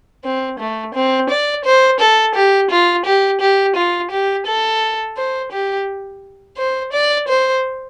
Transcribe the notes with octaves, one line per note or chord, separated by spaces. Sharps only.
C4
A3
C4
D5
C5
A4
G4
F4
G4
G4
F4
G4
A4
C5
G4
C5
D5
C5